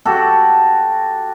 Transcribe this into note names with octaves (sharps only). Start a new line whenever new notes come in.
F#4 G4 A4